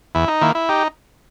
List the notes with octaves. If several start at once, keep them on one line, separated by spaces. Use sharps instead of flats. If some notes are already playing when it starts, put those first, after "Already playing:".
E2 E4
D#4
D#3 A#3 E4
E4
D#4 G4